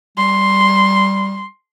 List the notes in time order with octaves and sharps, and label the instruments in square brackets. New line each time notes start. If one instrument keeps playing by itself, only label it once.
[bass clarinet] G3 [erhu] C6